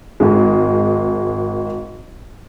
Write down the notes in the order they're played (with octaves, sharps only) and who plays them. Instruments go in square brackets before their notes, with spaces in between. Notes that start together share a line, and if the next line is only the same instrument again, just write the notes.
[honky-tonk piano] G#1 G#3